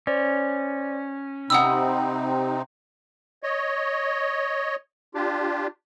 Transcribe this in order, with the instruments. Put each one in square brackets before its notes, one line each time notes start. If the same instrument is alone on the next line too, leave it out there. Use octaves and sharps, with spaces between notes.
[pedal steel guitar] C#4 [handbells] C5 D5
[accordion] C3 C4 D#4 [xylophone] F#5 D#6 E6 [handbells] B5
[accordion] C#5 D#5
D4 F4 G4